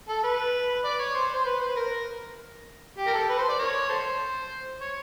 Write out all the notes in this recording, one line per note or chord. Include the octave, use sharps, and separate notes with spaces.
A4
B4
D5
C#5
C5
C5
B4
C5
B4
A#4
G4
A#4
A4
B4
C5
D5
A#4 C#5
A4 C5
C#5